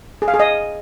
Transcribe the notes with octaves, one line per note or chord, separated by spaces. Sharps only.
G#4
F5
G#4
D#5